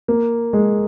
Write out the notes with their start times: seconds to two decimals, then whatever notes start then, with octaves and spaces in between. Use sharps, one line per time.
0.08 A#3
0.53 G#3